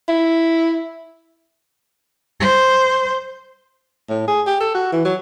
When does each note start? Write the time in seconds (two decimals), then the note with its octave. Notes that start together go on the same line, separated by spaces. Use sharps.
0.08 E4
2.40 C5
4.09 A2
4.28 G#4
4.47 G4
4.60 A4
4.75 F#4
4.92 E3
5.05 F#3